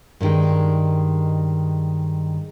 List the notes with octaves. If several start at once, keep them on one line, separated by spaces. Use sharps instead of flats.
G2 D3 D#3 G3 G#3